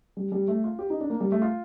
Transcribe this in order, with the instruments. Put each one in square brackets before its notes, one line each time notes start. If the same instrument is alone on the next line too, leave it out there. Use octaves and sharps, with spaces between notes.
[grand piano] G3
G3
A3
F4
G4
D#4
D4
A#3
G3
A3
F4